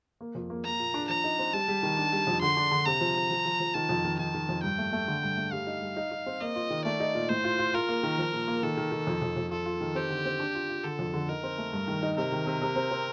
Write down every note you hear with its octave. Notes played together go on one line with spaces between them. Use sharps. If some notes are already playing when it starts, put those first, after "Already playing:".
A#3
F2
A#3
A#3 A#5
A#2
D4
F3 A#5
D#4
C4
G3 A5
G3
D#3
D4
G3
F2
D3 C6
D4
D3
C3 A#5
F3
F3
F3
F3
F3
D#3 A5
F2
D#3
D#3 A5
D#3
F2
G2 G5
A3
A3
D3
G2
A3
G3 F5
D#4
G3
D#4
D#4
C4
A#3 D#5
F4
D#3
A3 D5
D#4
A#2
A2 C5
F4
F4
F4 A#4
A#3
D#3
F3
A#2
A#3
D#3 A4
D#3
D#3
F2
F2
F2
F4 A4
F4
D#3
C4 G4
D3
C4
D4
F4
F4
D3 A4
F2
D3
D#4 A#4
C4
A3
G2
D#3
D#4
C3 A#4
D#3
C3
C3
C4
C4